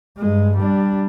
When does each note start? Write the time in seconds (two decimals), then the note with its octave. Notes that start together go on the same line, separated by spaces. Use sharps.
0.18 G2 G#3
0.58 G3 D4